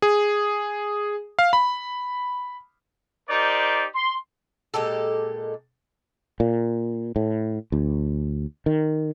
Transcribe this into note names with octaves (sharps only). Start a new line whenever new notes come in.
G#4
F5
B5
D#4 G4 A#4 C5 D5
C6
A#2 G#3 G4 A4
A#2
A2
D2
D#3